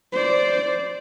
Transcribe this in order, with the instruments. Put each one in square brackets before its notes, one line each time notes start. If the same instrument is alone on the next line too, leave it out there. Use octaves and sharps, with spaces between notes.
[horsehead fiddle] C5 D5